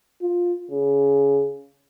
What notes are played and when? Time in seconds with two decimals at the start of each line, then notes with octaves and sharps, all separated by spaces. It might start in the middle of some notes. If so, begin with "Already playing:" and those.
0.22 F4
0.71 C#3